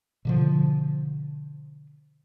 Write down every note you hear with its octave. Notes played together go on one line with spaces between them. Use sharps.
B2 D3 F3